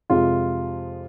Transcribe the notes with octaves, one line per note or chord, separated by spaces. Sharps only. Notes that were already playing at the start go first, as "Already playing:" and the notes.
F2 C3 G#3 F4